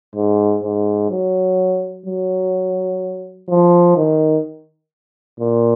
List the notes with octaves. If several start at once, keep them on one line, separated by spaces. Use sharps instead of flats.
G#2
G#2
F#3
F#3
F3
D#3
A#2